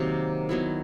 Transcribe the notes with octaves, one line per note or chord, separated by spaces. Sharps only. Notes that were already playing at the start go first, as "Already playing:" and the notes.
Already playing: C3 D#3 F#3 A#3
D#3 F#3 B3 E4